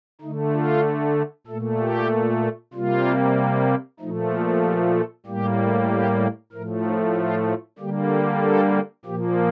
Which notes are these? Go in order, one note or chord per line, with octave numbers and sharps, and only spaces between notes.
D3 A3 D#4
F4
A#2 A3 A4
G4
C3 G3 A#3 F4
A#2 F3 A3 D#4
F4
G4
A4
A2 G3 A#3 G4
G4
A2 F3 A3 A#4
D#4
F4
D3 G3 A#3 G4
A4
A4
A#2 F3 A#3 G4